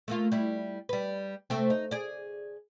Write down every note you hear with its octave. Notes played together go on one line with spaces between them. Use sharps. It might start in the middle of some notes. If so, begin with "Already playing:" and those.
A3 A#3 F4
G3 E4
G3 B4
C3 A3 C4
D#4
G#4 D5